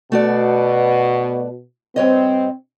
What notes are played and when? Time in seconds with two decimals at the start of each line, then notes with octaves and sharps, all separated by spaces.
0.12 B2 A3 F#4 D5
1.96 G2 C4 C#5 D#5